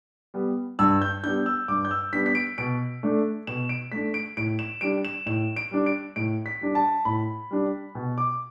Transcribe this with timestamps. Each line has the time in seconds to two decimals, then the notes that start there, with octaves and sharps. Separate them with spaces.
0.34 G3 B3
0.79 G2 E6
1.02 G6
1.24 G3 B3 D4 G6
1.46 E6
1.68 G2 D6
1.85 G6
1.91 E6
2.13 G3 B3 D4 B6
2.26 B6
2.35 D7
2.58 B2 D7
3.03 A3 D4
3.47 B2 E7
3.69 D7
3.92 A3 D4 B6
4.14 D7
4.37 A2 D7
4.59 E7
4.81 G3 D4 D7
5.05 E7
5.26 A2 E7
5.56 D7
5.71 G3 D4
5.86 D7
6.16 A2 D7
6.46 B6
6.61 G3 D4
6.75 A5
7.05 A2 B5
7.51 G3 D4
7.95 B2
8.18 D6